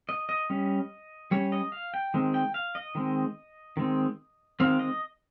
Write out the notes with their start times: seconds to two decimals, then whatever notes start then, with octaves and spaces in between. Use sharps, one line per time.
0.09 D#5
0.29 D#5
0.50 G3 C#4
1.31 G3 C#4 C#5
1.52 D#5
1.72 F5
1.94 G5
2.14 D#3 G#3 C4
2.34 G5
2.54 F5
2.75 D#5
2.95 D#3 G#3 C4
3.77 D#3 G#3 C4
4.60 D#3 G#3 C4 F5
4.79 D#5